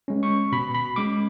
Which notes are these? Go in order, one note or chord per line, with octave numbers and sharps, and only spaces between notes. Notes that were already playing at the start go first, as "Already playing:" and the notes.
G#3 C#4
C#6
B2 B5
B5
G#3 C#4 D6